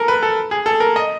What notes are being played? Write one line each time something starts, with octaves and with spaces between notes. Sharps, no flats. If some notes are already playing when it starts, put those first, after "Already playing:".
Already playing: A4 A#4
B4
A4
G#4
A4
A#4
D#5